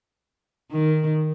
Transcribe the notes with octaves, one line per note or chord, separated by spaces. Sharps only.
D#3